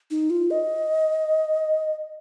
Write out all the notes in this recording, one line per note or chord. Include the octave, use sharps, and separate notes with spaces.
D#4
F4
D#5